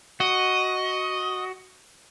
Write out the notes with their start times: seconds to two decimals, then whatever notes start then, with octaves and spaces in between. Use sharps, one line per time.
0.20 F#4 D#5